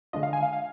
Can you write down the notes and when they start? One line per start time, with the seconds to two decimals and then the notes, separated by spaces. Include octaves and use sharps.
0.13 D3 G#3 D4 F4 D#5
0.23 F5
0.33 G#5
0.43 F5
0.53 F5